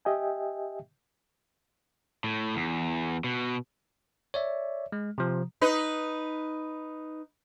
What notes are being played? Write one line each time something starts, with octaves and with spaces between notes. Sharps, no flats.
G4 D#5 E5 G5 G#5
A2
E2
B2
C#5 D5 E5
G#3
C3 F3
D#4 B4